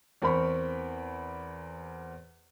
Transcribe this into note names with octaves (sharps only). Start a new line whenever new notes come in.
E2 C4 A#4 C5 B5 C#6